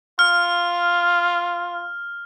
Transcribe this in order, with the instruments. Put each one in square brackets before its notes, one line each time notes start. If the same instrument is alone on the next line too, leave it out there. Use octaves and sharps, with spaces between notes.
[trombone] F4 [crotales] F6